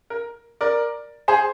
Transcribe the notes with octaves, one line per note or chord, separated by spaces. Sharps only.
A#4
A#4 D5
G#4 C5